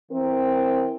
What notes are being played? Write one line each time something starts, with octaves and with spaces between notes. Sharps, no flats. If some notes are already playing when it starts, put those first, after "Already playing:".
E3 C4 A#4